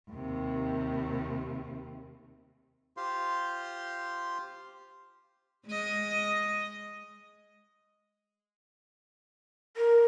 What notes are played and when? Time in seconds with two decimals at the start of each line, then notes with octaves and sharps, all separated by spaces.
0.11 D#2 C3
2.97 F4 G4 C5 F5 C6
5.66 G#3 D#5
9.77 A#4